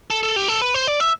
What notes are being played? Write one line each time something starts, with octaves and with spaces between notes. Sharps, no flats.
A4
A4
G4
A4
B4
C5
D5
E5